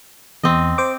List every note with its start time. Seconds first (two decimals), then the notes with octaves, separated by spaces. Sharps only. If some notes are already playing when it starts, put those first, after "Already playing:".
0.43 E2 C4 D#5
0.78 C5 D6